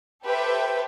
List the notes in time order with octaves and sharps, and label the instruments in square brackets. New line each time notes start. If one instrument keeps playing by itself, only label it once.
[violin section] G4 A4 B4 C5 E5 G5